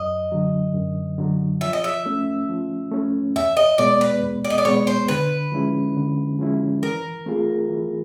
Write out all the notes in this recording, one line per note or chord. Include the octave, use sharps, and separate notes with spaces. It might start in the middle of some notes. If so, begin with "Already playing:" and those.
Already playing: F#2 D#5
D3 F#3
F#2
D3 F#3
F3 E5
D#5
E5
A3 C#4
F3
A3 C#4
E2 E5
D#5
B2 G#3 B3 D5
B4
E2
D5
D#5
D5
B2 G#3 B3 C#5
C5
D3 B4
F3 G#3 C#4 E4
D3
F3 G#3 C#4 E4
E3 A#4
A3 C4 F4 G#4
E3